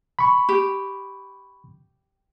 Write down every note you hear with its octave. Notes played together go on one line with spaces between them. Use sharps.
B5 C#6
G4